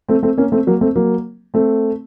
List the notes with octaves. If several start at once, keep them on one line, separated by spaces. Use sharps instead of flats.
A3 C4
A3 C4
A#3 C#4
A3 C4
F#3 A#3
A3 C4
F#3 A#3
A3 C4